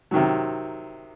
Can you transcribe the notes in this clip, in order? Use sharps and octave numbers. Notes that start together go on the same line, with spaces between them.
C3 D#3 F#3